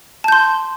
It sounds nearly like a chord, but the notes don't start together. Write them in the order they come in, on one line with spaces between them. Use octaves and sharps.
A5 G6 C6